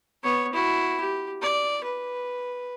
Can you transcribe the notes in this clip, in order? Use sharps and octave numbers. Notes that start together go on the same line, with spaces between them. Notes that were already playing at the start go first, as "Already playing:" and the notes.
B3 C#5
E4 F#4
G4
D5
B4